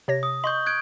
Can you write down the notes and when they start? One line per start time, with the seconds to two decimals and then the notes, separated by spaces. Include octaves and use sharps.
0.08 C3 C#5 A#6
0.23 D#6
0.44 D#5 C6 C#6 G6
0.66 F#6 G#6 D7